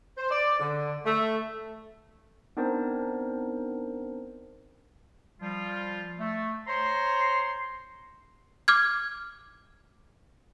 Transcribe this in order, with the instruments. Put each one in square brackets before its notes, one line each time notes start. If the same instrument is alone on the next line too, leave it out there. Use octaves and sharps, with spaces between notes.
[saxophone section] C5
D5
D3
A3
[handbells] B3 C4 D4 D#4 A#4 C5
[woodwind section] F3 G3 F4
A3
C5 C#5 A#5 C6
[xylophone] D6 F6 G#6